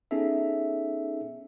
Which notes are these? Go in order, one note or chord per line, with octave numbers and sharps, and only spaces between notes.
B3 C#4 D#4 G#4 A4 E5